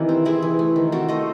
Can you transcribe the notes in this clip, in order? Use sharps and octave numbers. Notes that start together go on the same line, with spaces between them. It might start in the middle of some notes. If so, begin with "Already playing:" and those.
Already playing: C3 D#3 E3
C4
C4 E4 G#4
E3
A3
D#3
C4 F#4 A4
A3 C5 D#5